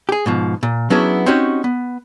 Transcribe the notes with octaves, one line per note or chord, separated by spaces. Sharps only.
G4 G#4
G#2 B2 F3
A#2
F#3 B3 C#4 D4 E4 G#4
C4 C#4 D#4 F#4 G4
B3